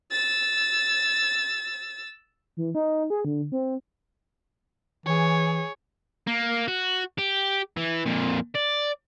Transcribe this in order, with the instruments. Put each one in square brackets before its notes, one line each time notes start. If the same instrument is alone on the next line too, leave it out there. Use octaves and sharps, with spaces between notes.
[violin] E6 A6
[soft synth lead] E3
D#4
G#4
D3
C4
[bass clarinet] E3 [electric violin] G#4 C#5
[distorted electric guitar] A#3
F#4
G4
E3
F2 A#2
D5